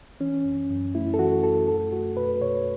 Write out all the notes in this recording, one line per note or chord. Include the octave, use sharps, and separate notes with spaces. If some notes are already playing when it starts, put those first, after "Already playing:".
E3 C#4
F#2
F#2
A3 E4
A4
E3 F#4
F#2 A4
A3 A4
A3 F#4
B2 B4
B2 C#5